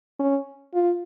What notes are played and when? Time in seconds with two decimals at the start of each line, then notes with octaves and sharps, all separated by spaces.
0.20 C#4
0.74 F4